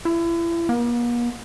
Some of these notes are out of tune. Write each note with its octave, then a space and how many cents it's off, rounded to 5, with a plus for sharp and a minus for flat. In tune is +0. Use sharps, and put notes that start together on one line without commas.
E4 +35
A#3 +45